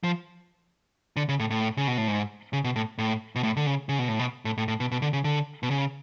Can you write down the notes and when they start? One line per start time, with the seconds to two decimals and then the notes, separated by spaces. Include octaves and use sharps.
0.03 F3
1.16 D3
1.29 C#3
1.39 A2
1.50 A2
1.77 C#3
1.88 B2
1.98 A2
2.08 G#2
2.53 C#3
2.64 B2
2.76 A2
2.98 A2
3.35 B2
3.43 A2
3.57 D3
3.67 C#3
3.89 C#3
3.99 B2
4.09 A2
4.19 B2
4.45 A2
4.58 A2
4.68 A2
4.80 B2
4.91 B2
5.02 D3
5.13 C#3
5.24 D3
5.63 B2
5.71 C#3